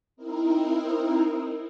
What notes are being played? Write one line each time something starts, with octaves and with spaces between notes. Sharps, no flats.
C4 D#4 E4 A#4